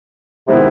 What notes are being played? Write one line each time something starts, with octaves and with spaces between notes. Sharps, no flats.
C3 D#3 G#3 B3 E4